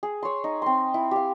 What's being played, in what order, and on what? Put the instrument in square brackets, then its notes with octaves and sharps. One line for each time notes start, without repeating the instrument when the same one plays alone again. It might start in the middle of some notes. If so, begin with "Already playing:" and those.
[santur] G#4
C#5 C6
D#4
C4 C6
E4
G4 F5